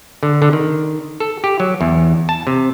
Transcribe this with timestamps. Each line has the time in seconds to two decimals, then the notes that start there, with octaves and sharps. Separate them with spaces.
0.23 D3
0.42 D3
0.53 D#3
1.20 A4
1.44 G4
1.60 F#3
1.81 E2
2.29 A5
2.47 C3